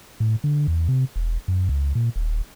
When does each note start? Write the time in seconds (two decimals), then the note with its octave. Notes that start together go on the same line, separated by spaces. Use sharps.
0.20 A2
0.44 D3
0.68 E2
0.88 C3
1.16 E1
1.48 F#2
1.69 C#2
1.95 A#2
2.16 D#1